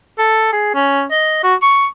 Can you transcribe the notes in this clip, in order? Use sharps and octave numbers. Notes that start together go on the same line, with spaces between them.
A4
G#4
C#4
D#5
F#4
C#6